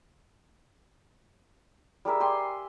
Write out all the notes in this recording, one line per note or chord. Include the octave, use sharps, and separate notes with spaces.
G3 G#4 A#4 E5
G4 G#5 C6